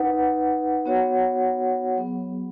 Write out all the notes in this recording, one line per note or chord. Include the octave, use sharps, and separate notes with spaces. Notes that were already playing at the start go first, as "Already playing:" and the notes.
Already playing: D#4 B4 F#5
B3 F#4 C#5 F#5
F#3 B3 G#4